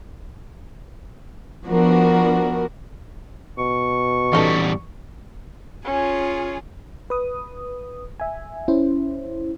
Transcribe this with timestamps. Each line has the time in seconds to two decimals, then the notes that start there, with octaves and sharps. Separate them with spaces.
1.66 F3 B3 D4 F#4 A#4
3.58 B2 C#6
4.33 E2 G3 C#4 D#4 A4
5.85 C#4 F4 G#4 C#5
7.10 B4 D#6
8.20 E5 G#5
8.68 C#4 E4 C5